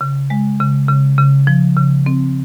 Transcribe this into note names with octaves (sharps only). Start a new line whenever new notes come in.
C#3
G#3
C#3
C#3
C#3
F3
C#3
C4